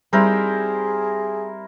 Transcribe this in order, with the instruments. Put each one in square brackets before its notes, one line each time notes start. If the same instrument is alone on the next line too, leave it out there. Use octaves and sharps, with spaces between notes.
[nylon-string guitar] G3 C4 D#4 [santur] E4 A#4 C5 [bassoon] G#4